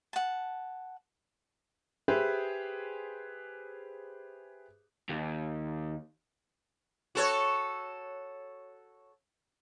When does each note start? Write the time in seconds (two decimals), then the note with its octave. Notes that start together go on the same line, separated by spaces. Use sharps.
0.13 F#5 A5
2.08 G4 G#4 B4 C5 E5
5.09 D#2
7.15 F#4 A4 C#5